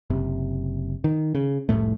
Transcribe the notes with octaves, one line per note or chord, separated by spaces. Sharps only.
F#1 C3
D#3
C#3
F1 C2 A2 A3